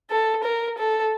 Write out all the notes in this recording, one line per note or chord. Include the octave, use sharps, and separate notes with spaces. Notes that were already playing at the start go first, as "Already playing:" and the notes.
A4
A#4
A4